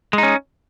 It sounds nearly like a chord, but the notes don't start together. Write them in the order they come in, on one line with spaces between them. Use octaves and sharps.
G#3 D#4 C#4